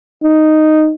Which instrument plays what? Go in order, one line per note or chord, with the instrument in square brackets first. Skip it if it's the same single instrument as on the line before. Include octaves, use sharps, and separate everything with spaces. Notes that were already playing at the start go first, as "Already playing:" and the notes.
[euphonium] D#4